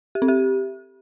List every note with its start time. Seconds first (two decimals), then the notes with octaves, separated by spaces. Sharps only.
0.15 G4
0.22 C4
0.28 G4